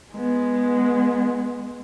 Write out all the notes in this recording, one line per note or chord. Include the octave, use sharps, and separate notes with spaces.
G#3 B3